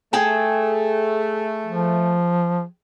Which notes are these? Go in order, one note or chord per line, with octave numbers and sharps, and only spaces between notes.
A3 G#4 G5 A5
F3